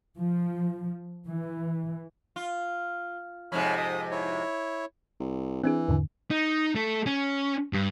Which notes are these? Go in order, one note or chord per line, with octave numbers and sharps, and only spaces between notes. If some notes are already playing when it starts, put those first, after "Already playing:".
F3
E3
F4
F2 G#2 C3 C#5 B5 F6
D#6
E4 C#5
C2
E3 C4 D4 G#4
E2 G#2 D3
D#4
A3 A4
C#4
G2